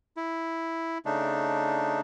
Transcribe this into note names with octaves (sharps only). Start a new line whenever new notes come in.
E4
C#3 A3 D4 D#4